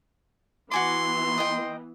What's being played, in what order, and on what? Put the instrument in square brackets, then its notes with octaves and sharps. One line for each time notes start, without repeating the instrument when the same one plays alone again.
[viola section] E3 B3 [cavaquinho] F#4 G#5 D6 [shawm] C6
[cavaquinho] D#5 G5